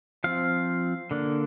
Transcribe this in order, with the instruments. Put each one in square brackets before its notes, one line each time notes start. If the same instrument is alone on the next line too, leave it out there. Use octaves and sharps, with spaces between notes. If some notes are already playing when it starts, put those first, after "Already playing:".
[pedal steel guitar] F3 C4 F5
D3 A#3 D4